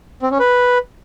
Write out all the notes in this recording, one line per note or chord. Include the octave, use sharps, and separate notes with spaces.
C4
C#4
B4